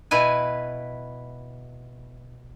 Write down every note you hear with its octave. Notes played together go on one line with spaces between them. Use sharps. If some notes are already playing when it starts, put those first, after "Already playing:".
B2 E4 B4 G#5